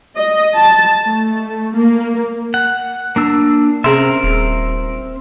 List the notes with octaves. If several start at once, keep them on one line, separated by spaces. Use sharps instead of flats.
D#5
A5
A3
A#3
F#5
A#3 D4 E6
C3 C4 C#4 G#4 A#4 E5 C6
D#1